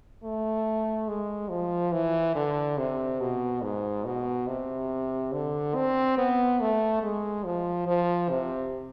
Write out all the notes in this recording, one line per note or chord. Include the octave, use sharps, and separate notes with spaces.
A3
G#3
F3
E3
D3
C3
B2
G#2
B2
C3
D3
C4
B3
A3
G#3
F3
F3
C3